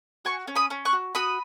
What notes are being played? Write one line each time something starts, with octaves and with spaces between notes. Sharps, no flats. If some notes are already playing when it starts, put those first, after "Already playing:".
F#4 G#5 C#6
C#4
B5 D#6
C#4
C#6 F#6
F#4
F#4 B5 D#6